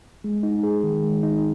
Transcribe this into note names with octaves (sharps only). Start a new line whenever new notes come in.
G#3
D#4
G#4
D#3
G#3
D#4